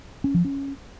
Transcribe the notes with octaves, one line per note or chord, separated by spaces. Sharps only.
C#4
F3
C#4